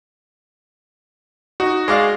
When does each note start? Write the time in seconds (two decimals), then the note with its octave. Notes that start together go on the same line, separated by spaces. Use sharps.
1.60 D#4 F#4
1.88 G#3 D5 F5